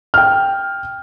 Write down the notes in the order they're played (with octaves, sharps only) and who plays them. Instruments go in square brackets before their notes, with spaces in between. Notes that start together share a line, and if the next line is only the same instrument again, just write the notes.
[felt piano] G5 F6